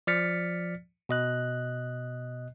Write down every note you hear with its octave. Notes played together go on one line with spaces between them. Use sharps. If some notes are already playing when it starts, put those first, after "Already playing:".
F3 D5 F6 A6 B6 C#7
B2 D#5 F#6